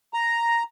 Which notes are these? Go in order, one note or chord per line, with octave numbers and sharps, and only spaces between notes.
A#5